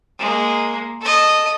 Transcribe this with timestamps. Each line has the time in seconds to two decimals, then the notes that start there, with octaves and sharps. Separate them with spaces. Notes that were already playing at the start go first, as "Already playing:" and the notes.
0.19 G#3 A#3
1.01 A4 D#5